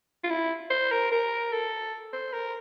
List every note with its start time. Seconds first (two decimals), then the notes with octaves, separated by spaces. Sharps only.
0.24 F4
0.30 E4
0.70 C5
0.91 A#4
1.12 A#4
1.52 A4
2.13 C5
2.33 A#4